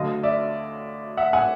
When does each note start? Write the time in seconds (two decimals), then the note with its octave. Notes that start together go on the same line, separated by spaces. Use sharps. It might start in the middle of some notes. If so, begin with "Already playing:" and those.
Already playing: D2 D3 F#3 D#5 F5
0.23 D5 E5
1.17 E5 F#5
1.33 F#5 G#5